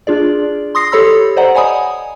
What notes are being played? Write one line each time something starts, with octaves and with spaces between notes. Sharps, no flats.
D4 F4 G#4 D5
C6 D#6 A#6 C7
G4 A4 C#5 B5 E6
C5 D5 D#5 F#5 A#5
C#5 F#5 G#5 B5 D#6